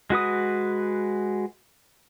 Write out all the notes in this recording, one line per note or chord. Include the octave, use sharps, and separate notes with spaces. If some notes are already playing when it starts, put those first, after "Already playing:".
G#3 F#4 B4 D#6